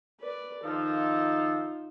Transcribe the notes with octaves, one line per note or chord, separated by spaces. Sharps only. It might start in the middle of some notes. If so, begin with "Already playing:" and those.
B4 D5
D#3 F3 D#4 F4 A4